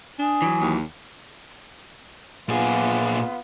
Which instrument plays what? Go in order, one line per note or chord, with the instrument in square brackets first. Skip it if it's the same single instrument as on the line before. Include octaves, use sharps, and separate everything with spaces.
[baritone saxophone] D4 [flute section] G#5 D#6
[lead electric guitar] E3 F#3
[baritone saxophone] D#2
[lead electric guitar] A#2 G#4 [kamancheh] B3 F4